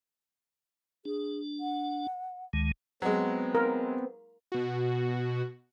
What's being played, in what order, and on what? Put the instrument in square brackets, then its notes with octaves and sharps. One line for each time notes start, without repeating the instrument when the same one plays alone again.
[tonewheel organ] D4 [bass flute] G#4
[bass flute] F#5
[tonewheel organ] D2 D#3 G#3
[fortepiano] F#3 G#3 [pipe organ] B3 C4
[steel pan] A#4
[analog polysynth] B2 F#4